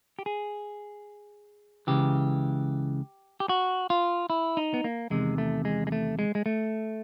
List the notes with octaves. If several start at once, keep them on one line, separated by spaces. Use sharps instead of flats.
G4
G#4
C#2 C#3 E3 G4
G4
F#4
F4
E4
D#4
B3
A#3
E2 C3 D#3 G#3
A3
G#3
G#3
A3
G#3
G#3
A3